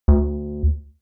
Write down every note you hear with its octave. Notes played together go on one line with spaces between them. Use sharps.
D2